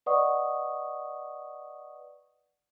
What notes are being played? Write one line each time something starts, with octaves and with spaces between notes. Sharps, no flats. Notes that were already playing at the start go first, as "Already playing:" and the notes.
B4 D5 D#5 F#5 C#6 D#6